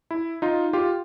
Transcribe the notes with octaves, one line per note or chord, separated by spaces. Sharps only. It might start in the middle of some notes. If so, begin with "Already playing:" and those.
E4
D#4 F4
F4 G4